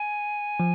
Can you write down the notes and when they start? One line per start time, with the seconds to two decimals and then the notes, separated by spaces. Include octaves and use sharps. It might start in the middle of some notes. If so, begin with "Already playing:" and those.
Already playing: G#5
0.60 F3